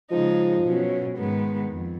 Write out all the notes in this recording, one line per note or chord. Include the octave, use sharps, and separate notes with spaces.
C#3 F3 G#3 D#4
B2 F#3 C#4
G#2 D#3 G#3 B3
F2